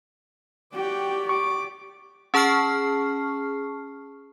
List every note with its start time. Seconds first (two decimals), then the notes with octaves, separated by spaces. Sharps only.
0.74 F#4 G4 D5 G5
1.29 C#6 D6
2.34 C#4 G#4 A5 C#6 F6 C7